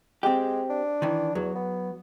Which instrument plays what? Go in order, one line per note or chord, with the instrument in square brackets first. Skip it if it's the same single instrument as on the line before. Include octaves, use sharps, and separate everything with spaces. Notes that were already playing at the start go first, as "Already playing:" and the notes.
[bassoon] G#3 [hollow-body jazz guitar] C4 G4
[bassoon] D4
[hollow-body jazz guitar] D#3 E3
[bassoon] E2 [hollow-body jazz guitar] F#3
[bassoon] B3